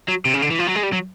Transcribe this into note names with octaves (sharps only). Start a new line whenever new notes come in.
F#3
C3
C#3
D3
E3
F3
F#3
G#3
G3
F#3